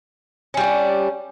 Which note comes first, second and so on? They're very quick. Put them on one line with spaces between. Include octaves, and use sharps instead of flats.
C#4 G3 F#4 D4